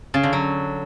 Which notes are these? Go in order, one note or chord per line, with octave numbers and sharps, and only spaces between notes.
C#3
D3
F#3